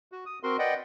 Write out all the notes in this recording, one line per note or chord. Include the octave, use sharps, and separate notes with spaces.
F#4
D#6
C4 F#4 A#4 C6
B4 D5 D#5 F#5 G5